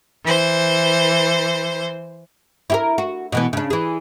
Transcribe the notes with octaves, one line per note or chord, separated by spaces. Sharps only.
E3 C5
E4 G4 A#4
F#4
B2 E3 B3
C#3 D4
E3 G#4